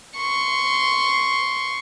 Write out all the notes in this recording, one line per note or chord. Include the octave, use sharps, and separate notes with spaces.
C6 C#6